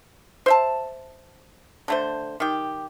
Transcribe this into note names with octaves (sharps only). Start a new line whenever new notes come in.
C5 E5 A5
D3 A3 C5
D#3 G4